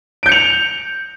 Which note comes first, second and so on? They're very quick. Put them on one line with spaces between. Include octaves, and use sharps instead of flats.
D7 G6 C#7 F7